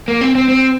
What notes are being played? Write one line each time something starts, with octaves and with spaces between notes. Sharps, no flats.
A#3
C4
C4
C4